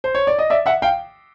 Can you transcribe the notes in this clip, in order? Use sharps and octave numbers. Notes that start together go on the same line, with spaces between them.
C5
C#5
D5
D#5
D5 E5
E5 F#5
F5 G5